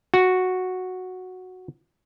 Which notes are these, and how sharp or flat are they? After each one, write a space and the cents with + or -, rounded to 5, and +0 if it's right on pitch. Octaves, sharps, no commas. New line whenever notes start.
F#4 -5